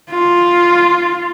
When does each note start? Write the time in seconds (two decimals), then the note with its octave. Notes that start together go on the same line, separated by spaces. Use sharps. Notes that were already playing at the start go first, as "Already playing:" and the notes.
0.10 F4